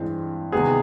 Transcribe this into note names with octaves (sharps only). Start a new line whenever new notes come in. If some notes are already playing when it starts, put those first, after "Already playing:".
Already playing: G2 E3 G#3 C4
C3 D#3 G#3 B3 G#4